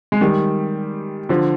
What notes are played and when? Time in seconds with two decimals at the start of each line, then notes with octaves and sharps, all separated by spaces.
0.12 G#3
0.21 D#3 G3
1.29 D3 F3